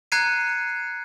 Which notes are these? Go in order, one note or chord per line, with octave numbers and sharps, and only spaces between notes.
A#5 F#6 G#6 C7 C#7 D#7